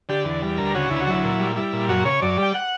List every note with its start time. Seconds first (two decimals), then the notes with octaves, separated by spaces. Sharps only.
0.09 D3 G4
0.25 E2
0.42 G3
0.58 D2 A#4
0.74 C#3 F#4
0.90 D2 E4
1.00 F#4
1.07 F#3 E4
1.24 A#2
1.40 G3
1.56 G3 E4
1.73 A#2
1.89 F#2 F#4
2.05 C#3 C#5
2.22 F#2 D5
2.38 G3
2.43 G5
2.54 F#5